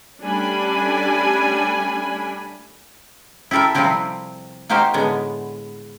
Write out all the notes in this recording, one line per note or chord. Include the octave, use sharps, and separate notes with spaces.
G3 A3 C#4 D4 G#5 B5
E4 G4 A4 A#4 E5
C3 F3 G3 C4 E4 G4
A#3 D#4 F#4 G4 C5 F5
A2 D3 G#3 B3